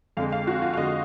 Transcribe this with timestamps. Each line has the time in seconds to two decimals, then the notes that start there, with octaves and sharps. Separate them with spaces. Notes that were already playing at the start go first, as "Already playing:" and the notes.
0.17 F2 D3 G#3 F5
0.32 F5
0.47 F#4
0.62 F4
0.73 F5
0.77 F2 D3 G#3 D#5